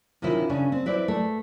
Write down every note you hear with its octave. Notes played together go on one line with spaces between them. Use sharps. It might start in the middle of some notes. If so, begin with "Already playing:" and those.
C3 D#3 C#4 E4 F4
C#3 C#4 D4
C4
E4 B4 C5 D5
A3